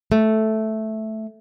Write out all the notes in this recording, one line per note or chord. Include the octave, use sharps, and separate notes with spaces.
A3